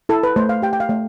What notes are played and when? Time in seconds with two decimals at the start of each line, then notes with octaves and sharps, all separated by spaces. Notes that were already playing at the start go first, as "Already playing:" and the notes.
0.09 E4 A4
0.23 B4
0.36 A3 C5
0.49 F5
0.62 G4 G5
0.73 G5
0.80 F5
0.89 A3